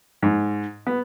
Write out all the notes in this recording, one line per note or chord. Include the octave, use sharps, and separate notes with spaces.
G#2
B3